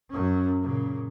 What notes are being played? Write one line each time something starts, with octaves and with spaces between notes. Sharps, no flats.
F#2 C#4
A#2 C#3